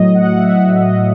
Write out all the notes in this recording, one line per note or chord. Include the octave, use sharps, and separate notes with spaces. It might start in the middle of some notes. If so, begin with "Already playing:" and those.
Already playing: A2 F#3 D#5
F#5
F#5
E5
F#5
E5
D#5